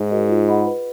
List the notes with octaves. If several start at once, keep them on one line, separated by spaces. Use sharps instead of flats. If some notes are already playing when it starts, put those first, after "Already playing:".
Already playing: G#2 D#4
F#4 A#4 D#5
F4
G#4 D#5 F#5 B5
B4